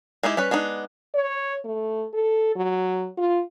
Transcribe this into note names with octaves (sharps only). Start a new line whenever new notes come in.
G#3 D#4 E4 G4
G3 C#4 B4
G#3 B3 D4 D#4
C#5
A3
A4
F#3
F4